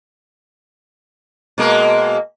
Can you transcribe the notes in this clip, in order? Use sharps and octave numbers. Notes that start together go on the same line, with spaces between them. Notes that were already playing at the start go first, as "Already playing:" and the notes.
B2 G#3 A#3